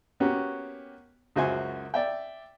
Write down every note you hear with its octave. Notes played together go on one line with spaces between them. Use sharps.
A#3 B3 C#4 F#4 G4
C#2 F#2 F#4 C5 E5 G#5
D5 E5 G5